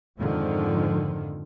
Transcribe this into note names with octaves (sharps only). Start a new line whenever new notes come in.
F2 G#2 D3 D#3 F3